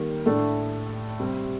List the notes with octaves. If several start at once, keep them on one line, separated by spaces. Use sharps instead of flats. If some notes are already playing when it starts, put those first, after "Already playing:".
Already playing: D#3 G3 A#3
A2 A3 D4
C3 G3 C4